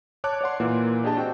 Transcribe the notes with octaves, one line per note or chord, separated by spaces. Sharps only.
C#5 A5 D6 F#6
C#5 D5 F#5 C6
A#2 E3 A#3
D4 G4 G#4 D#5 A5
C4 F#4 G5